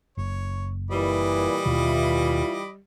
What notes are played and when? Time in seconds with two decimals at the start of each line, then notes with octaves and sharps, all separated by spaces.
0.17 F#1 C#5
0.91 A#2 E3 G3 D#5 B5 D6
1.66 D#2 B2 D#3 E3 F4